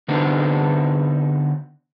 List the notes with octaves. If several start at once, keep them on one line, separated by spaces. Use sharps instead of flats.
D3 B3 C4 D4 D#4